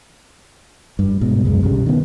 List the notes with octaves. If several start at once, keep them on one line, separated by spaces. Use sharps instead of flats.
G2
G#2 B2
C#2 F#2 G#3
B1 G2 C#3 G3
D#3 B3